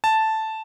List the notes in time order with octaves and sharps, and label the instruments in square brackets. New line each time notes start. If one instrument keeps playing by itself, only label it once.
[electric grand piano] A5